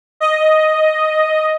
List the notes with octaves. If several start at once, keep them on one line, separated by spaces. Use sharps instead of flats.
D#5